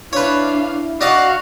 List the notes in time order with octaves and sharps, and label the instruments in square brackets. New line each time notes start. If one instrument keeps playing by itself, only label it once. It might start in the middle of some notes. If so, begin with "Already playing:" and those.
[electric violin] D4 F5 [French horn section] E4 [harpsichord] B4 C#5
[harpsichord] D4 D#5 A5 [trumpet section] F#4 [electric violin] F5